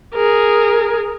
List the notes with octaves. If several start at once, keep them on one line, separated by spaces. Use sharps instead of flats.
G#4 A#4